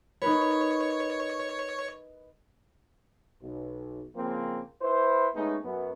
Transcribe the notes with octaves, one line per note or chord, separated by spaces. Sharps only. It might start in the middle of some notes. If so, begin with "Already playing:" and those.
D#4 A#4 B4 C#5
B1
C#3 F3 A#3 C4
E4 B4 C5
G#3 A3 B3 C#4 D#4
F#2 B3